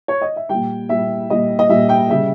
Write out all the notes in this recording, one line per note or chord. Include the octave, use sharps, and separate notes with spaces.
C#5
D#5
E5
G3 G5
A#2
A#2 G3 E5
A#2 G3 D#5
D#5
A#2 G3 E5
G5
C#3 G3 E5